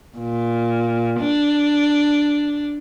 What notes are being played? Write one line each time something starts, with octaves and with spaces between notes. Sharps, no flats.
A#2
D4